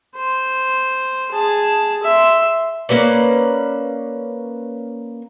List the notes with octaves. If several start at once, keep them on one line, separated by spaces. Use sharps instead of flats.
C5
G#4 A5
E5 C6
A#3 C#4 B4 D5